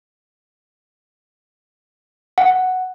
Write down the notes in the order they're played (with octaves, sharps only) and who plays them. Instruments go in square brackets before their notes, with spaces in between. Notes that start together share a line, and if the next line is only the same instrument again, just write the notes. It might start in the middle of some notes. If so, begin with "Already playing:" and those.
[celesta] F#5